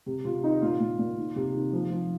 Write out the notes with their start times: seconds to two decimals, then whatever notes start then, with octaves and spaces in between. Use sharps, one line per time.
0.06 C3
0.25 C3 F4
0.43 D#3 D#4
0.62 A#2 F4
0.80 A#2
0.99 A#2
1.17 D#3
1.36 C3
1.54 D#3
1.73 F3
1.91 F3